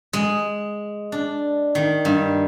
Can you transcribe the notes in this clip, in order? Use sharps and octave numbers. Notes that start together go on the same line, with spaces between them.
G#3
D4
D#3
G2